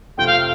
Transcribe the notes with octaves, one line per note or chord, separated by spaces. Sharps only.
F2 C3 A3 C4 F4 G5
F5